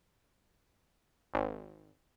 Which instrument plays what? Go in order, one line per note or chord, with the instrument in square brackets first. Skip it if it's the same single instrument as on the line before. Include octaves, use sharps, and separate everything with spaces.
[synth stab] G#1